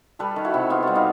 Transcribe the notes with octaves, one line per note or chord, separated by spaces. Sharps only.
G3 A4 B4
D#3
E4 F#4
C3
B3 F4
G3 F#4
D#4 F4